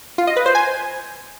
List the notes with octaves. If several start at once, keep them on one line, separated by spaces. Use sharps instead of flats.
F4
D#5
B4
C5
G#5